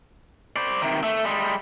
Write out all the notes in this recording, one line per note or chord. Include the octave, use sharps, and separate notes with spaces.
C5 D5
C3 D#3
A3
G3 G#3